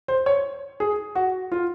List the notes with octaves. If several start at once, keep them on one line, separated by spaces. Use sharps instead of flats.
C5
C#5
G#4
F#4
F4